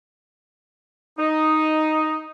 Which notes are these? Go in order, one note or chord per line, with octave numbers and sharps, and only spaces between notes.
D#4